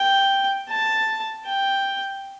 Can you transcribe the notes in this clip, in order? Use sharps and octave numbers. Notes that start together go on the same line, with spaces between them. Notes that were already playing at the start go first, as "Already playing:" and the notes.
Already playing: G5
A5
G5